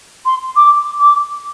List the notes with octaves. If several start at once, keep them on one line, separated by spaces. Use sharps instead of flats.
C6
D6
D6